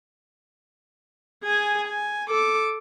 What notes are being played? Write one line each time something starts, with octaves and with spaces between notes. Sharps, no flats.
G#4 G#5
G#5
A4 D6